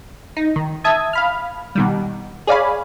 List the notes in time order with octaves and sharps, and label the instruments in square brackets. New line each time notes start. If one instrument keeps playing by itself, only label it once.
[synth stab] D#4
D#3
E5 A5 D#6 G#6
F5 B5 F6
B2 D#3 G3
G#4 C#5 D5 F5 G#5 B5